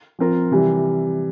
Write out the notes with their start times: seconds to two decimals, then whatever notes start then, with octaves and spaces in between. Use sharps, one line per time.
0.19 F3 C4 F4 A#4
0.51 C3 E3 G3